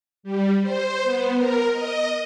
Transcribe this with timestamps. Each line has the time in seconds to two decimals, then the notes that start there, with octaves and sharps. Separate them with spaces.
0.23 G3
0.62 C5
1.04 B3
1.35 A#4
1.71 D#5